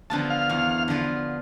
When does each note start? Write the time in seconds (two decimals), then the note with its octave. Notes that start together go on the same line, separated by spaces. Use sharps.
0.10 D3 F3 B3 F4 A5
0.30 F5
0.49 E2
0.88 D3 F3 B3 F4